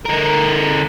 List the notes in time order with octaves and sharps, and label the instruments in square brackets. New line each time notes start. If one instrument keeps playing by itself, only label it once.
[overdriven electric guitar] D3 A#4